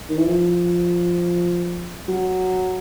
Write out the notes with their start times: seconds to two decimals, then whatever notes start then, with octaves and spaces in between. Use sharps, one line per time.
0.10 D#3
0.18 E3
0.26 F3
2.09 F#3